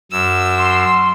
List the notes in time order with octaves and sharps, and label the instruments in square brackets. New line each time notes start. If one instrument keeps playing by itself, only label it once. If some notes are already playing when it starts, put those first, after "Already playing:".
[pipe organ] F#2 [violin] E6
[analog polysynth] C6